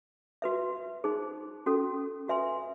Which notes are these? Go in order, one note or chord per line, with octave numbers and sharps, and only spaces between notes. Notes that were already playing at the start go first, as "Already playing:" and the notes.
F#4 B4 E5
D#4 G#4 C5
C#4 F#4 A4
F#4 B4 E5 G#5 C6